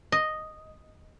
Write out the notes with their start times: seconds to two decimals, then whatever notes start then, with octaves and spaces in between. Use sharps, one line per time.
0.12 D#5